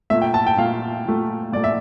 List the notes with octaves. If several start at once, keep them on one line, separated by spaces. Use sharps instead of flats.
A#2 A3 E5
G5
A5
G5
A#2 A3 F5
A#2 A3
A#2 A3 D5
E5